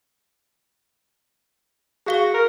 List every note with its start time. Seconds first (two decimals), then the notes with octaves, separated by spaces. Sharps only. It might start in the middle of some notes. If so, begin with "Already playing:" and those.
2.06 F#4 G#4 F5 G7
2.34 A#4